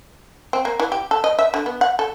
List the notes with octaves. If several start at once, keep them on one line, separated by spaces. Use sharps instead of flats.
C4
A#3
E3
G4
A4
D#5
E5
D3
B3
F#5
A4